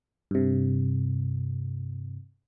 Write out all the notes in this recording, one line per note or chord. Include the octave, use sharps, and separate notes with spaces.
G2 C3